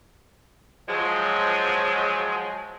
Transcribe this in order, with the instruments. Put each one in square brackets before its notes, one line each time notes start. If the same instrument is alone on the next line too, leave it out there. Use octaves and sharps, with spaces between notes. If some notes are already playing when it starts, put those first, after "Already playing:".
[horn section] F3 F#3 G#3